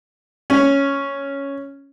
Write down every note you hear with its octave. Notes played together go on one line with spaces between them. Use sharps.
C#4